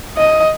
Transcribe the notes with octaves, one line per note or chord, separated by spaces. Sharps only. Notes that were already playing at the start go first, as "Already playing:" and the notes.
D#5